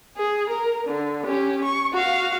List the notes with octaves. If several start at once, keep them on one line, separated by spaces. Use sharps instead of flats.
G#4
A#4
D3
C#4 G4
C#6
F#4 F5